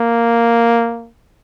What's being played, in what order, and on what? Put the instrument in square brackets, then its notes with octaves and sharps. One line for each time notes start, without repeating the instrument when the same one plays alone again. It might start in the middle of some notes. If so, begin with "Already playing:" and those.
Already playing: [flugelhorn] A#3